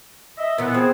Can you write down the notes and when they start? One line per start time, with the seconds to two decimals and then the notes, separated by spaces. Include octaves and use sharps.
0.38 D#5 E5
0.58 A#2 E3 B3
0.74 C4 G#4